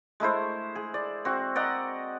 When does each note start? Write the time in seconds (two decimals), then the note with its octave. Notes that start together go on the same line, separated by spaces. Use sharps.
0.20 G#3 A3 E4 C5
0.75 G#4
0.94 D5
1.25 C4 F#4
1.56 D5 D#5 F#5 A#5